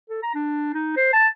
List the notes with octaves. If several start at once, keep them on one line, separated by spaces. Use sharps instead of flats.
A4
A#5
D4
D#4
C5
A5